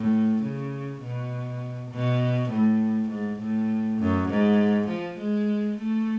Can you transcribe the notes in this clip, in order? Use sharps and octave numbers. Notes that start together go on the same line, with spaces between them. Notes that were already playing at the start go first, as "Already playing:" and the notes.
Already playing: A2
C#3
B2
B2
A2
G#2
A2
F#2
G#2
F3
G#3
A3